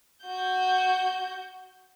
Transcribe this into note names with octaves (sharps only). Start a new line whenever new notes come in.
F#4 G6